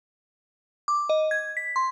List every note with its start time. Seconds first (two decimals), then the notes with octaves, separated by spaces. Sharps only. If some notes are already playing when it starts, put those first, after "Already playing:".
0.88 D6
1.09 D#5
1.31 G#6
1.57 B6
1.76 C6